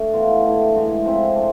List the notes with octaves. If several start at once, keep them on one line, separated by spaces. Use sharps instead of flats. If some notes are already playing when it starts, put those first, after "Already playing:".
Already playing: A3 D4
E3 B3 F4
D3 A3 E4
A2 E3 G#3 D4
F3 G#3 C4 E4
A3 D4